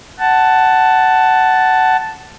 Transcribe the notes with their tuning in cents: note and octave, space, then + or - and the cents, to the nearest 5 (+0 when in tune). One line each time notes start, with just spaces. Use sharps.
F#5 +15 A5 +0